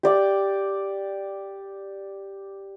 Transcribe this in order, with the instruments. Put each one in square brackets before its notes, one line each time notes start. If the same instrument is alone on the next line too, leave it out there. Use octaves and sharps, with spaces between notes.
[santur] G4 D5 G5